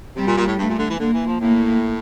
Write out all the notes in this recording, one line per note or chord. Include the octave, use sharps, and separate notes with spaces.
C3 G3
A#2
A#2
A2
G2 A3
A#2
D3
E3
D3 A#3
E3
F3
A2 A#3